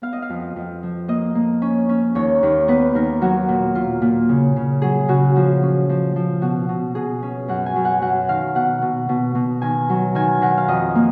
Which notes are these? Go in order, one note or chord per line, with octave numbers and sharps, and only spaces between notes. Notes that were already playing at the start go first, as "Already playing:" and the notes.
B3 F5
D#5
F5
F2
F2
F3
A#3 D#5
A#3
C#4
C#4
D#2 C#5
D#2
B3 B4
D#2 A#4
F#3 F#4
A#2
A#2 F4
A#2
C#3
C#3
F#3 G#4
C#3 F#4
F3 F#4
C#4
F3
F3
B2 F#4
B2
B2 G#4
C#4
F#2 F#5
G#5
F#2
F#5
F#2 F#5
D#3 F5
B2 F#5
B2
B2
B2
D#3 G#5
F#3
D#3 G#5
D#3 F#5
F5
F2 D#5
A#3